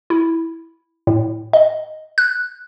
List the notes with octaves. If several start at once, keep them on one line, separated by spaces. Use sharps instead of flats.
E4
A2
D#5
F#6